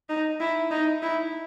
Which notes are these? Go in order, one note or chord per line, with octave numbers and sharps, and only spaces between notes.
D#4
E4
D#4
E4